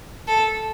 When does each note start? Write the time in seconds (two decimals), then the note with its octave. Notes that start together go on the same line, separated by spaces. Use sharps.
0.28 A4